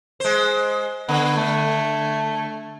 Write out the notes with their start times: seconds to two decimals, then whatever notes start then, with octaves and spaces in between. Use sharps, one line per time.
0.20 G#3 C5
1.09 D3 B3
1.37 A3